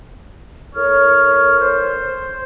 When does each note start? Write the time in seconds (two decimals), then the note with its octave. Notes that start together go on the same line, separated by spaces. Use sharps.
0.76 A2 A#4 C#5 F6
1.60 C5